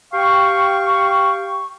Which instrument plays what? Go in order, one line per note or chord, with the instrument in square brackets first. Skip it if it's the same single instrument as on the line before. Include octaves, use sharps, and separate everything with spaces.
[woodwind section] G4 F5 G5 C#6